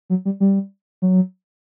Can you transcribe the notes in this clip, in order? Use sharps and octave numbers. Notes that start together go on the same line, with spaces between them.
F#3
G3
G3
F#3